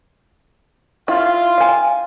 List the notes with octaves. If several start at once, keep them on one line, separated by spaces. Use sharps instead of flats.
E4 F4
F5 G#5